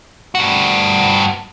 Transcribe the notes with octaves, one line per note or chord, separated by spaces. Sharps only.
G2 F#4